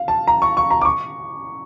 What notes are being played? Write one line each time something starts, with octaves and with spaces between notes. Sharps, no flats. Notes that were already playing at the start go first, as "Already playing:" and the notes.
Already playing: F5
A5
A#5
C#6
C#6
A#5
D6
C#6